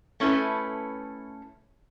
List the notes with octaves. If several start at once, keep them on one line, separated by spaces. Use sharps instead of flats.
A3 C#4 E4 A4 B4